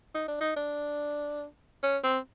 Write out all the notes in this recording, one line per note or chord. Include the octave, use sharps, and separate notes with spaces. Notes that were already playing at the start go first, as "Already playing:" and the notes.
D#4
D4
D#4
D4
C#4
C4